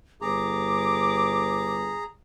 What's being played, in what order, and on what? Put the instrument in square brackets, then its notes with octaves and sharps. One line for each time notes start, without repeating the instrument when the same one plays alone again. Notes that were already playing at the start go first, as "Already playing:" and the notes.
[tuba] G1 [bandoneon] G#4 A#5 [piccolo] D6